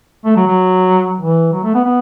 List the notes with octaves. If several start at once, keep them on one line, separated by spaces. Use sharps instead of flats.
A3
F#3
F#3
E3
F#3
A3
B3
B3